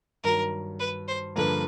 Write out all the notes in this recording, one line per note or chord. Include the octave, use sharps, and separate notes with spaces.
G2 D#3 F#3 A#4
B4
C5
G2 D3 F3 A#3 B4